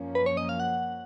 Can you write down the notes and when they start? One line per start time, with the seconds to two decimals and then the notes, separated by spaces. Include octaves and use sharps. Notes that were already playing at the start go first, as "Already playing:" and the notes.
Already playing: F#2 F3 A#3 C#4
0.15 B4
0.26 C#5
0.37 D#5
0.49 F5
0.60 F#5